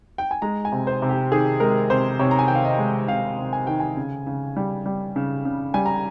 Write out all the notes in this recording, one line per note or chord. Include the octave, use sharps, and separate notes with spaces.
G5
G#5
G#3 A#5
G#5
C3
C5
C3
G4
D#3 G#4
G#3 A#4
C3 C5
C3 C#5
A#5
G#5
D#3 G5
F5
D#5
G#3
C3 F5
C3
G#5
D#3 G5
G#5
C#3
C#3
G3
G3
C#3
C#3
G3 G#5
A#5